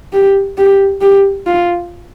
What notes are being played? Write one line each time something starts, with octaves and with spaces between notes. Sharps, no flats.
G4
G4
G4
F4